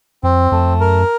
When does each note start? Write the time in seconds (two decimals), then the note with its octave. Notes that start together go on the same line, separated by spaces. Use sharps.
0.23 F2 C4
0.52 F2 A3
0.80 F#2 A#4